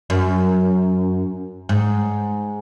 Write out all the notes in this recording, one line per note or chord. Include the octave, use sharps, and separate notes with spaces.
F#2
G#2